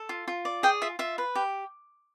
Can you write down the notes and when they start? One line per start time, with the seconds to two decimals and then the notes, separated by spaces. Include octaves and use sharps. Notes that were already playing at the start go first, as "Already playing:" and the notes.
Already playing: A4
0.09 F4
0.28 F4
0.45 D5
0.63 G#4 G5
0.82 F4 E5
0.99 F4 E5
1.18 B4
1.35 G4